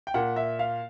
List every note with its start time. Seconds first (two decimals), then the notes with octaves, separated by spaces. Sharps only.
0.07 G5
0.14 A#2 F#5
0.36 E5
0.59 F5